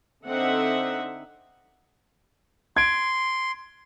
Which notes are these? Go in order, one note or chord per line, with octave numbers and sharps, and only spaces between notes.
D3 C4 D#4 E5 F#5
C6 G#6 D7